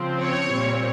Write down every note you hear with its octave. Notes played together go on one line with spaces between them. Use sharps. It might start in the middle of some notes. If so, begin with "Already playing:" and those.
Already playing: C#3 F3 C4
C#5
A#2 G3 C4